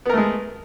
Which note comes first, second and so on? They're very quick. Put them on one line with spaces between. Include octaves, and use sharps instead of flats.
B3 A#4 A3 G#3